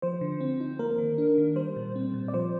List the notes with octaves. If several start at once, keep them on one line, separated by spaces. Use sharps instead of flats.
F3 C5
D3
C4
D#4
A#3 A#4
D#3
D4
D#3
G3 C5
A#2
C4
A#2
D5
F3 C5